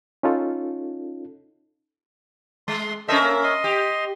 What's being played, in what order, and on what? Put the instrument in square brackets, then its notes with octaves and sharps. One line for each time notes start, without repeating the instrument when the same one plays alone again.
[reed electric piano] C#4 D#4 F4 A4
[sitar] G#3 [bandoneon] C6
[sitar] C#4 A#4 E5 [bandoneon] A4 C5 D#5
[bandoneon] A#3
D#5 C6
[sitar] G4